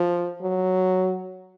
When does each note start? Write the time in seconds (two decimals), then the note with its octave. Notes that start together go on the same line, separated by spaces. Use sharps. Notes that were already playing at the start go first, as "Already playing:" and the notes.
Already playing: F3
0.42 F#3